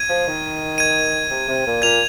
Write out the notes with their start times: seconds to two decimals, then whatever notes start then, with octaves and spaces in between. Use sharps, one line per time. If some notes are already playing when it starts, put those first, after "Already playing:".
Already playing: G#6 D#7
0.09 F3
0.26 D#3
0.78 G#6 D#7
1.30 C3
1.48 C3
1.66 A#2
1.82 A#2 G#6 F7